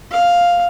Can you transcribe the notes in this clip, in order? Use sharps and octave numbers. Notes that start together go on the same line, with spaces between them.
F5